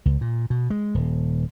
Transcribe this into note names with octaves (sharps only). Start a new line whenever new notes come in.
C#2
A#2
B2
G#3
D#1